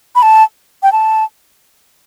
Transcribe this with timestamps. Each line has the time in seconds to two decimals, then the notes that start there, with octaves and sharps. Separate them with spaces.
0.15 B5
0.22 A5
0.83 G5
0.92 A5